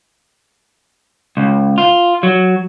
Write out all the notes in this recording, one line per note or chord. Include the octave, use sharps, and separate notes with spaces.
C#2
F4
F#3